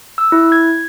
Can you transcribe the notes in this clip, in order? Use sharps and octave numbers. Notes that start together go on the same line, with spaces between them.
E6
E4
G#6